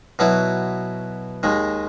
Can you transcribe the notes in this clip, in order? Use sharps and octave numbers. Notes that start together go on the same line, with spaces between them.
B2 F#3 B3 E4
D#2 D#3 G#3